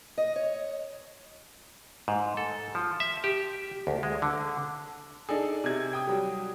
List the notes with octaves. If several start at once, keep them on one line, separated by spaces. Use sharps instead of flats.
D#5
C#5
G#2
A4
F3
E5
G4
D2
G#3
D3
D4 D#4 G#4 A4 D5
C3 G#6
G5 D#6
F#3 G3